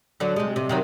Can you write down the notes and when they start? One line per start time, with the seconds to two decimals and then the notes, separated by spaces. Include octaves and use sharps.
0.20 D3 F#3
0.36 C3 G#3
0.56 C3
0.69 C3 D#3 F#3